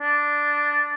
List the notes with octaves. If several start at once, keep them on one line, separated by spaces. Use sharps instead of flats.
D4